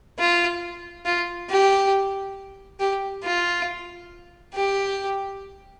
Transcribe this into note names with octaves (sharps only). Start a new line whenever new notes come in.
F4
F4
G4
G4
F4
G4